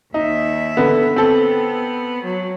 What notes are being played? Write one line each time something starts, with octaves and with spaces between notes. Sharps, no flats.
D#2 D#4 E5
D3 B3
B3 C4 A4
F#3